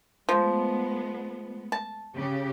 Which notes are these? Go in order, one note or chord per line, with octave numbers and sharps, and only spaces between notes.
F3 G#3 A3 B3
A5
C#3 G4